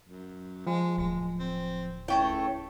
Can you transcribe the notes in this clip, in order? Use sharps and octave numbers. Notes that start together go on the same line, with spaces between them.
F#2
F3 G#3
D1 G#3
C4
C#2 A3 C#4 E4 G5